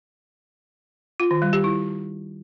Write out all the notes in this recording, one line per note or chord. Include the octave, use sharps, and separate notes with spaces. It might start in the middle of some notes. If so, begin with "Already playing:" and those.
F4
D#3
G3
G4
E4